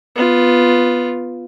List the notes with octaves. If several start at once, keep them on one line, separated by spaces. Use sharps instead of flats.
B3 F4